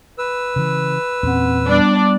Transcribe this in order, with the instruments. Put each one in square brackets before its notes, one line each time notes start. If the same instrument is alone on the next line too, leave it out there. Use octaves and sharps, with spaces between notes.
[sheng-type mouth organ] B4 E6
[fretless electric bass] C#3 E3
[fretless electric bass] E2 A#2 C#4 [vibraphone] C4 F#5
[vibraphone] G3 B3 [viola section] D4 D5